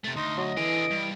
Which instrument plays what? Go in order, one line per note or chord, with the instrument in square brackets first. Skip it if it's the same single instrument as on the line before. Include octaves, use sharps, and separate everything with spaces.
[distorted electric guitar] C3 A3 [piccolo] A6
[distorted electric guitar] D2 [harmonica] D#4 [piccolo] C6
[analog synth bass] F#3 [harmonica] D#5
[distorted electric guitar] D3 G#4 [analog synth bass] E3 [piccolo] D7
[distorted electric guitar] G2